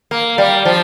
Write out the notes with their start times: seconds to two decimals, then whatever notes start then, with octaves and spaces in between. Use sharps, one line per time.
0.11 A#3
0.38 G3
0.65 F3